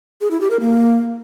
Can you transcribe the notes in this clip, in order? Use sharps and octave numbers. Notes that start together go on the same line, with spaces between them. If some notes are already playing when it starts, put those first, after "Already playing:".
G#4
E4
G4
A#4
A#3